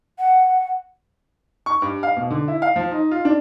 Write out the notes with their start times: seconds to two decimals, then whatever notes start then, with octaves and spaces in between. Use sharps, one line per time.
0.19 F#5
1.66 C#6
1.82 G2
2.03 F5
2.17 B2
2.30 D3
2.48 E4
2.62 F5
2.76 F3
2.91 D#4
3.11 F4
3.25 D4